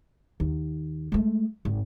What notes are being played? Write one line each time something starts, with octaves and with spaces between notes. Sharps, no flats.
D#2
G#3 A3
G#1